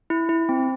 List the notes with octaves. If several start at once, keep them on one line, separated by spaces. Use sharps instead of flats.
E4
E4
C4